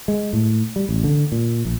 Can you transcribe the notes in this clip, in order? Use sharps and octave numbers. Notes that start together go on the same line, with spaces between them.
G#3
A2
G3
A1
D3
A#2
A#1